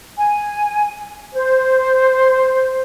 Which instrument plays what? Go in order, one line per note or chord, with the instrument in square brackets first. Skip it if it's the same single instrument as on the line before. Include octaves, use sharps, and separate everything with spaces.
[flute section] G#5
C5